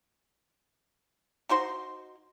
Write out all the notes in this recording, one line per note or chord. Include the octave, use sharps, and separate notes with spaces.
D#4 F#4 C5 C6